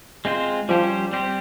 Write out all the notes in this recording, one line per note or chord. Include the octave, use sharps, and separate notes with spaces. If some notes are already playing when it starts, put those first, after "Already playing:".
G#3 C4 F4 C5
F3 G3 C#4 G4 C5
G3 C4 G4 C5